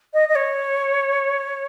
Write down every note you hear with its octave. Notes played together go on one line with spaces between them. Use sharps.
D#5
D#5
C#5